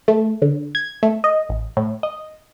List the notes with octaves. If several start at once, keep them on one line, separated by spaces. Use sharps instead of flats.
A3
D3
G#6
A3
D#5
A1
A2
D#5